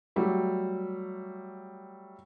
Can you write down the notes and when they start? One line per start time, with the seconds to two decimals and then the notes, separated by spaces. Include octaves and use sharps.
0.16 F#3 G3 A3